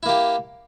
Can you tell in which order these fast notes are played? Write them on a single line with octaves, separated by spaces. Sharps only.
E4 A#3 G4